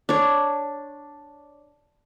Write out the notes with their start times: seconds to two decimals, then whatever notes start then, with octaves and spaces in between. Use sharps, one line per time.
0.09 D4 C#5